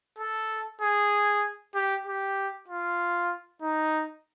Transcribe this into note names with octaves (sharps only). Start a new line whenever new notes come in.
A4
G#4
G4
G4
F4
D#4